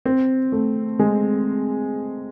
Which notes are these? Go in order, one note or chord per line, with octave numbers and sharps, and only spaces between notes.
C4
A3
G#3